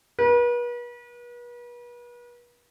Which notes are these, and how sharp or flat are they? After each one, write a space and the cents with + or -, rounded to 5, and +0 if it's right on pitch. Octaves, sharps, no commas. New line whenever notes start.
B4 -40